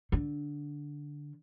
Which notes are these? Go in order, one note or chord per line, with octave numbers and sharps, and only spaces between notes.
D3